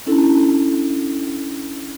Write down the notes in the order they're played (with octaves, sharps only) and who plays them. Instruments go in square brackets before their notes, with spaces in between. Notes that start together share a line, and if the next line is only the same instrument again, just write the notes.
[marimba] C#4 D4 E4 A4